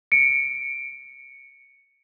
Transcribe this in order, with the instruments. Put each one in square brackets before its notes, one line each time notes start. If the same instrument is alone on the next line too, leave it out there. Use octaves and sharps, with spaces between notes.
[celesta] C#7 D7